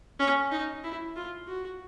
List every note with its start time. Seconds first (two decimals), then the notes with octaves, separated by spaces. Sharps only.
0.20 C#4
0.51 D#4
0.84 E4
1.16 F4
1.48 F#4